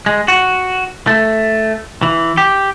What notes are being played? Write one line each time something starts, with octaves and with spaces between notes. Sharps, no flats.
G#3
F#4
A3
E3
G4